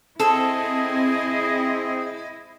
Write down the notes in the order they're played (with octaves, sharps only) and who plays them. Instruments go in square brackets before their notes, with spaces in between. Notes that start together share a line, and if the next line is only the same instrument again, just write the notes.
[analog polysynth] C4 [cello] E4 D#5 [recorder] G#4 [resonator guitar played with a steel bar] A4